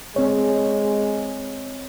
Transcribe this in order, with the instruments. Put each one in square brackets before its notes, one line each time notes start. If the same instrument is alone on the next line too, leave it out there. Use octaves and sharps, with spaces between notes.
[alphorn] G#3 [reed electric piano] C4 C#5